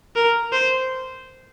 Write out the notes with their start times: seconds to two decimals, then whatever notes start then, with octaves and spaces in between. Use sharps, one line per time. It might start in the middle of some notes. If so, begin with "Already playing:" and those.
0.16 A#4
0.52 C5